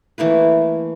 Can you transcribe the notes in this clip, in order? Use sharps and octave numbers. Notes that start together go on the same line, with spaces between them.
E3 A3 A#3 B4